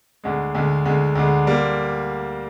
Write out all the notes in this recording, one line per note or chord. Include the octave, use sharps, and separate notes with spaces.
D2 D3 G#3
D2 D3 G#3
D2 D3 G#3
D2 D3 G#3
D3 G3 A#3